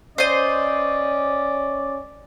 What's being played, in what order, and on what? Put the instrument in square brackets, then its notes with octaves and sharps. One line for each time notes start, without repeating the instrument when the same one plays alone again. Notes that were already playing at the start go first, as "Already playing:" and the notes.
[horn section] C#4 D5 [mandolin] C5 D#5